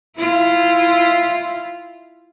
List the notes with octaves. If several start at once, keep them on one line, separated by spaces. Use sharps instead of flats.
E4 F4